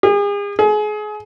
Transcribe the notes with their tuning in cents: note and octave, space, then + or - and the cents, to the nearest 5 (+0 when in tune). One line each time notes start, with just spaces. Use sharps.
G#4 -40
G#4 +30